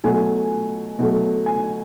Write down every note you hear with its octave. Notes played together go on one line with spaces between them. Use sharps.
B2 F#3 A3 G#5
B2 F#3 A3
G#5